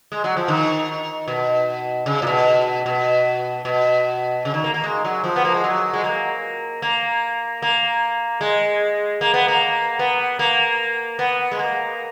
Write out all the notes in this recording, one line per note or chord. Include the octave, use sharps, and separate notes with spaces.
G#3
F#3
F3
D#3
B2
C#3
A#2
B2
B2
B2
C#3
D#3
A#3
A#3
G#3
F#3
F3
B3
A#3
G#3
F#3
G#3
A#3
A#3
A#3
G#3
A#3
B3
A#3
B3
A#3
B3
G#3
A#3